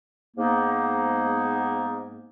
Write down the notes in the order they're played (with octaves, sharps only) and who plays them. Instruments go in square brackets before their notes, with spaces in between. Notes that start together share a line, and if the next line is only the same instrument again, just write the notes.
[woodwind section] G#2 A#3 B3 D#4